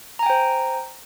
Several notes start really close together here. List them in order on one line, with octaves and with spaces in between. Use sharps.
A#5 G#5 G5 C5